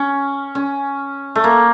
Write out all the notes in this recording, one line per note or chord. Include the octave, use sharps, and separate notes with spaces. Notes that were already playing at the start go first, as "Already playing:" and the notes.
Already playing: C#4
C#4
A3
A#3